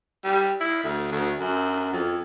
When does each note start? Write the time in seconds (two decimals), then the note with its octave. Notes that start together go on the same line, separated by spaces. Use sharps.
0.24 G3
0.61 E4
0.84 D2
1.11 D2
1.39 F#2
1.93 F2